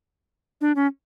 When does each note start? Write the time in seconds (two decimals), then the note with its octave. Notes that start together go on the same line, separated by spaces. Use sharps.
0.61 D4
0.76 C#4